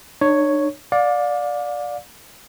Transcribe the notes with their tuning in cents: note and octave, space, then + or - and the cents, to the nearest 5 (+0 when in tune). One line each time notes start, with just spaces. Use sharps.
D4 +45 C#5 +0
D5 +0 F5 +35